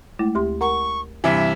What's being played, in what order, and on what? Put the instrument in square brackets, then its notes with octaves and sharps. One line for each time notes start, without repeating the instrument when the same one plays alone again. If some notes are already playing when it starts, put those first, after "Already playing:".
[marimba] G#3 A3 E4
D2 G4 C6
[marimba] A#4 F#5 A#5 [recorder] C#6
[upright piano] G2 C3 E3 [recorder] E5